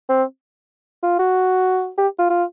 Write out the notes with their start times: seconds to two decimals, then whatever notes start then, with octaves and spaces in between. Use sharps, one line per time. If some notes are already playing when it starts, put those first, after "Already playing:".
0.09 C4
1.03 F4
1.19 F#4
1.98 G4
2.19 F4
2.30 F4